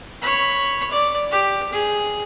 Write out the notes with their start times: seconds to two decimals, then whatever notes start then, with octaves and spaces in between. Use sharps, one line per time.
0.22 C#5 B5
0.91 D5
1.31 G4
1.72 G#4